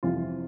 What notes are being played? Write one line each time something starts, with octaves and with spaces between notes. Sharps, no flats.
F2 C3 E3 F4